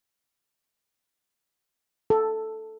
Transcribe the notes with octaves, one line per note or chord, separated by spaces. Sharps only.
A4